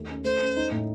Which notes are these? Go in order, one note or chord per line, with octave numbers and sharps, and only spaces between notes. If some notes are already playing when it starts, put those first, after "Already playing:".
Already playing: D#2 A3
C#4
A3 C5
C#4
D#4
A2